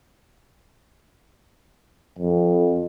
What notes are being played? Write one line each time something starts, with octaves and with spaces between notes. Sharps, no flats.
F2